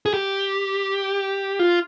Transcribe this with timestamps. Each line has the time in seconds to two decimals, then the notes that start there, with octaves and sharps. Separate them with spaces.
0.06 G#4
0.14 G4
1.59 F4